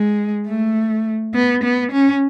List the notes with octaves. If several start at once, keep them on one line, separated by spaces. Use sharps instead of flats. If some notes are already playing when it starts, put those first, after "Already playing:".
Already playing: G#3
A3
B3
B3
C#4